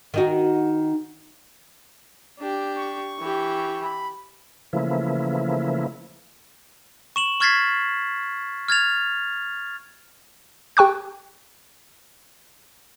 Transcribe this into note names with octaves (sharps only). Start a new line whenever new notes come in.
D#3 D#4 F#4
D4 G4
C#6
E3 G4
B5
C#3 E3 F3 A3 A#3 E4
C#6 E7 F#7
C#6 F6 G#6 A6 B6 C7
F6 G#6 A6 F7
G4 G5 C#6 F#6